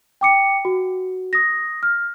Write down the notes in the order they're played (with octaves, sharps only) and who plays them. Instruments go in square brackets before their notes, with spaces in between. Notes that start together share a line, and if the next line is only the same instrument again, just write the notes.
[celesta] G5 D6 C#7
F#4
D#6 A#6
F6